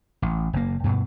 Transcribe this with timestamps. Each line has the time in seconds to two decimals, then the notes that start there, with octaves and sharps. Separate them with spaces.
0.22 A1
0.53 F#1 A#3
0.84 G2 B2